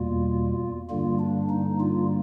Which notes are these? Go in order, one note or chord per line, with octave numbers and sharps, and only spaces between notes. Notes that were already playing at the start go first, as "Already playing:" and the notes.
Already playing: E2 B2 G3 A#3 F4
G2 D3 G3 A#3 F4
D4
D#4
F4